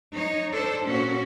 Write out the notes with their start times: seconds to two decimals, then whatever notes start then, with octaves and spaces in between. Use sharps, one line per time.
0.13 D#4 C#5
0.52 D4 A4 C5
0.86 A#2 C#4 F#4